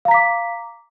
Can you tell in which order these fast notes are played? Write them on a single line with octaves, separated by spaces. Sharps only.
F5 A#5 B6 D6